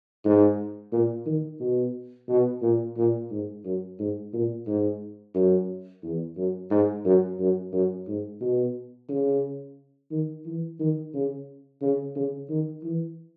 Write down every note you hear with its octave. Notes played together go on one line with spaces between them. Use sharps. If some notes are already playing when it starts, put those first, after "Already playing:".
G#2
A#2
D#3
B2
B2
A#2
A#2
G#2
F#2
G#2
A#2
G#2
F#2
E2
F#2
G#2
F#2
F#2
F#2
G#2
B2
C#3
D#3
E3
D#3
C#3
C#3
C#3
D#3
E3